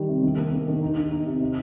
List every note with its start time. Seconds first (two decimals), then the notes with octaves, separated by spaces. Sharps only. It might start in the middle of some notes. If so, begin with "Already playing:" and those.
Already playing: D#3 G3
0.09 C3
0.23 D#3
0.38 A#3
0.52 A#3
0.68 D#3
0.83 D#4
0.97 D#4
1.12 D#4
1.26 C3
1.41 C3